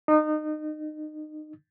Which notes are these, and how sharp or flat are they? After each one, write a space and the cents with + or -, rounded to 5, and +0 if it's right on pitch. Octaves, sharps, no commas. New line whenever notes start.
D#4 -30